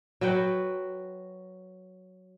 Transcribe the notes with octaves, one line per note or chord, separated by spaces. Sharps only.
F#3 F#4 B4 G5